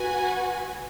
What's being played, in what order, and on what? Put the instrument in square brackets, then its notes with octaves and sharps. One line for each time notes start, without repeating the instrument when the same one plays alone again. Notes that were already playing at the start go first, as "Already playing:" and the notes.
Already playing: [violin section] F#4 B4 G#5